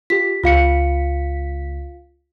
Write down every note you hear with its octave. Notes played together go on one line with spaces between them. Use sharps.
F4 G4 B6
C#2 F4 F5 B6 C#7